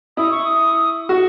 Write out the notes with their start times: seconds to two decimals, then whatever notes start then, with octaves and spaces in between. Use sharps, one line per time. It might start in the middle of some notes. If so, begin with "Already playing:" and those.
0.17 E4 D#6
0.31 C#6
0.45 D#6
1.09 F#4 C#6